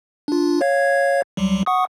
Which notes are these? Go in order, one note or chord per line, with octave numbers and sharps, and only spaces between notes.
D4 F4
C#5 F5 G#6
C#2 F#3 G3
F#5 C#6 D#6